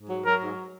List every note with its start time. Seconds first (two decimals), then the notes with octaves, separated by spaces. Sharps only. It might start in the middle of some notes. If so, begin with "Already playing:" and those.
Already playing: G#2
0.10 F#3
0.25 F#3 A#4
0.41 G#2